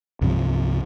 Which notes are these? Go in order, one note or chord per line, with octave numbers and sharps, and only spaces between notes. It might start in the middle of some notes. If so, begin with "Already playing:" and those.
C2 G2 C3 F3